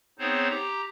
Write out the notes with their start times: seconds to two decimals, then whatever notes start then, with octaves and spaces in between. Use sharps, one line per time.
0.19 B3 C4 D#4 G#4 C5 C#5
0.50 G4 A#5